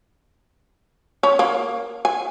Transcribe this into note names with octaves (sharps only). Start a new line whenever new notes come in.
C#4
A#3
G#5